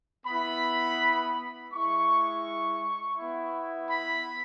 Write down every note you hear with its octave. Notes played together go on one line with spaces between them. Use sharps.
B3 E4 B5
G#3 E4 C#6
B3 E4
B5